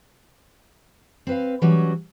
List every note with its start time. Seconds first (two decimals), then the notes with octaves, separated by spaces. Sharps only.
1.27 C4 B4 F5
1.62 E3 F#3 G3 C#4 F#4